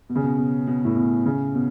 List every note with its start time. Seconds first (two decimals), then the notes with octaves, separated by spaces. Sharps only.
0.09 B2
0.15 C#3
0.23 B2
0.38 B2
0.67 B2
0.85 A2
0.96 B2
1.26 C#3
1.55 B2